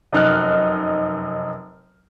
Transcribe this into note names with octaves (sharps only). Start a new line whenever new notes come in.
F1 F#2 D#4 F6 F#6